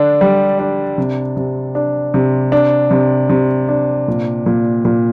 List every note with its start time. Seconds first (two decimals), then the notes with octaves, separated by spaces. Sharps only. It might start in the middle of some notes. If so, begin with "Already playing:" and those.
Already playing: D3 D4
0.21 G3
0.59 D4
0.98 C3
1.37 C3
1.75 D4
2.14 C3
2.52 D4
2.91 C3
3.29 C3
3.69 D4
4.08 A#2
4.46 A#2
4.85 A#2